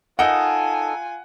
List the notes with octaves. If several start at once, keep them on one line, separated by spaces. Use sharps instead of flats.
D#4 F4 A4 A#4 F#5 G#5